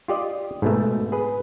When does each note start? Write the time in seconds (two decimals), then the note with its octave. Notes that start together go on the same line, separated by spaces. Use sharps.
0.08 F4 G4 D5 D#5
0.62 G#2 B2 A3
1.12 G#4 B4